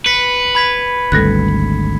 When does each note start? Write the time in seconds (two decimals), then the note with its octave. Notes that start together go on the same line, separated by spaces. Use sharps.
0.06 B4 B6 C#7
0.55 B5 G#6 B6
1.12 G#1 D2 G3 A4 F#6